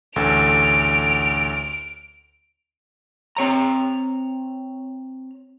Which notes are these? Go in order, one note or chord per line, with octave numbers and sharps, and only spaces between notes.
A1 D2 A4 D7 F7
C4 C#5 A#5